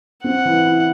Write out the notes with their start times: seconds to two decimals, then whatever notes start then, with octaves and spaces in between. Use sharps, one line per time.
0.24 C4 F#5
0.45 E3
0.65 E4